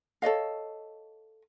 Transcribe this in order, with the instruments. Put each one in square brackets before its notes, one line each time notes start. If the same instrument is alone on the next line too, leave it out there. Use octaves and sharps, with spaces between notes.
[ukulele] A4 C#5 D#5 F5